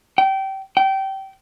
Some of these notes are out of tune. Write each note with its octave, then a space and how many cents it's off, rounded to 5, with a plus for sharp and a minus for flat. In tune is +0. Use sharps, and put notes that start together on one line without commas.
G5 -25
G5 -20